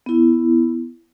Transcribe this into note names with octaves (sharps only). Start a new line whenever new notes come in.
B3 E4